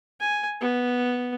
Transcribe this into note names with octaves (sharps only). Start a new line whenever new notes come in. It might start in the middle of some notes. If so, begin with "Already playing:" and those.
G#5
B3